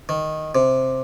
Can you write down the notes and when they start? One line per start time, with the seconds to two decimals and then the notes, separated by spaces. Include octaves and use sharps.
0.09 D#3
0.55 C3